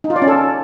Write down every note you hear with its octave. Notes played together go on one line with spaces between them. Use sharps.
D#4
F4
D5
C#4
A4